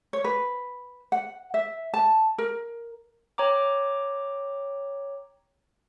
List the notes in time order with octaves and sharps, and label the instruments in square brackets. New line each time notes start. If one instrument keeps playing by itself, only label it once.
[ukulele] C#5
B4
F#5
E5
A5
A#4
[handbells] C#5 G5 A#5 D6